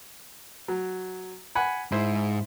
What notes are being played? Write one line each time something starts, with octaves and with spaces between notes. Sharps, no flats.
F#3
F#5 G#5 B5
G#2 E4 C5